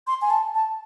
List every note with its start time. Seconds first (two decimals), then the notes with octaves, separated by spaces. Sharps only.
0.07 C6
0.22 G#5
0.30 A5
0.55 A5